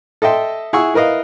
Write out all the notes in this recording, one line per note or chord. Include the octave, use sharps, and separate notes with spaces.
A4 D#5 E5 G5 C6
E4 G#4 F#5 C#6 E6
E4 A#4 B4 D#5 F5